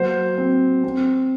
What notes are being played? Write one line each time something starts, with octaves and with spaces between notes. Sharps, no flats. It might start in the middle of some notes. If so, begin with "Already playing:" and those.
Already playing: F#3 A#3 C5
C4
C4